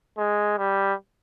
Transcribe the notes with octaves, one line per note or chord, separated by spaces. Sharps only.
G#3
G3